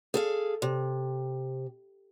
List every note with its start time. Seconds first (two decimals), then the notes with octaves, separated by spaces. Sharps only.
0.14 G#4 A4 F5
0.62 C3